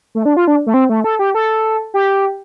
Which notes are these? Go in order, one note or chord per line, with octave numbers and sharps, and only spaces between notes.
A3
D4
F4
D4
A3
C4
A3
A4
G4
A4
G4